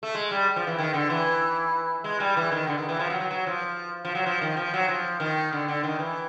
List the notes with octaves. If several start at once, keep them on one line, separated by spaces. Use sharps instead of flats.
A3
G#3
G3
F3
E3
D#3
D3
E3
G#3
G3
E3
D#3
D3
D#3
E3
F3
F#3
F#3
F#3
F3
F3
F#3
F3
D#3
F3
F#3
F3
D#3
D3
D3
D#3
E3